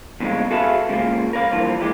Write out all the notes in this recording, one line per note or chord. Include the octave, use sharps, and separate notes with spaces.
E2 G2 C#3 G#3 A#3
F#4 G#4 A4 B4 E5 F5
C#3 G#3 A#3 F4
A#4 B4 D5 F5
G2 E3 F3 A#3 F4
A#2 E3 G#3 G4